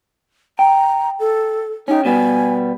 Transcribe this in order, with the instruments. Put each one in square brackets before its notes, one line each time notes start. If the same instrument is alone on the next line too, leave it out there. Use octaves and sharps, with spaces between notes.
[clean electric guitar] G5 [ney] A#5
[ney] A4
[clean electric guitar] C#4 G4 [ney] D#4
[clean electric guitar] B2 G3 B3 [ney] G#5